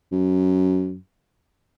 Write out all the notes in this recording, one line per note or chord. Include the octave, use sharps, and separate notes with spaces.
F#2